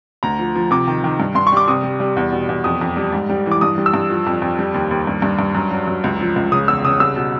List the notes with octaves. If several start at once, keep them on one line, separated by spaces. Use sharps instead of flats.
D2 A#5
F3
F3
C3 D6
D#3
D#3
G2
G2 C6
C#6
G3 D6
C3 D#6
G3
G3
E2
B2
E2
F2 D#6
F2
G3
G#2
G3
E3
D6
G2 D#6
G3
E6
G2
F3
F2
F2
G3
D#2
D#2
G2
G2
G2
F#2
F#3
F#2
C#2
F3
C#2
C#3 D#6
E2 E6
C#3 D#6
C2 E6
B2